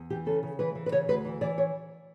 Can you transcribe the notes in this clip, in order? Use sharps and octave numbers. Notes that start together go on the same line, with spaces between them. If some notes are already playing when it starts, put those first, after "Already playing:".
Already playing: E2
E3 G4
C#3 A4
C#3
E3 B4
E3
B4
C#3 C#5
D2 B4
E3
E3 D5
C#5